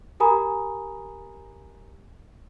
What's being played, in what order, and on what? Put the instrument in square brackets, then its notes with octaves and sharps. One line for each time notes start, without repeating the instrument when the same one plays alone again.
[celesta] G4 A#4 G#5 A#5 B5 D#6